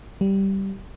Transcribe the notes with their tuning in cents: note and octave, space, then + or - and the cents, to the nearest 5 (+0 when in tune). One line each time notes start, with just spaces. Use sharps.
G3 -10